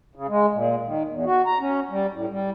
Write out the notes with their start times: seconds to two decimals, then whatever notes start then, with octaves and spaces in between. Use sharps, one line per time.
0.15 C#3
0.29 G#3
0.54 A#2
0.85 D#3
1.09 E2
1.26 F#4
1.46 A#5
1.60 C#4
1.90 G3
2.14 A2
2.30 G3